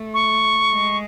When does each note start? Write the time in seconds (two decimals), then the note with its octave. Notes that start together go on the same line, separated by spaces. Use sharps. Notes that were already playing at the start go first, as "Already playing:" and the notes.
Already playing: A3
0.14 C#6
0.73 G#3